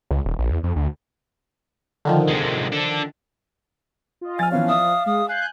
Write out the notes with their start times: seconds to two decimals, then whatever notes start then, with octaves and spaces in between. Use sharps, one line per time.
0.11 C#2
0.25 D#1
0.39 A#1
0.51 E2
0.64 F2
0.76 D2
2.05 D3 D#3 F3
2.28 C3 G#3
2.72 D4 A4
4.21 F4 D#5
4.39 F3 G#5 F6 A6
4.51 E3 B3 C#4 F5
4.68 D5 E5 D#6
5.06 G#3 D#6
5.28 F5 G#5 F#6 G6